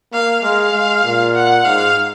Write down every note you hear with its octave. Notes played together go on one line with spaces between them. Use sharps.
A#3 F5
G#3 F5
G#3
A#2
F#5
G#2 F5